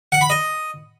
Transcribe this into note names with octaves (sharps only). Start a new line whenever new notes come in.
F#5
B5
D#5